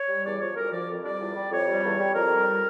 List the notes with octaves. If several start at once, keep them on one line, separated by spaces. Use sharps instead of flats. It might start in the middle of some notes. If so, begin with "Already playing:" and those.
Already playing: C#5
G3
E2 D5
F3 C#5
D2 A#4
F3 D5
F2
G3 D5
E2
G3
F2 C#5
G3
E2
G3
F2 A#4
G3